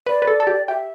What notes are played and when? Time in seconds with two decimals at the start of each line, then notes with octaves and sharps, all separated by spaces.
0.06 B4 D5
0.22 B4
0.27 A4
0.40 A4
0.47 G4
0.68 G4 E5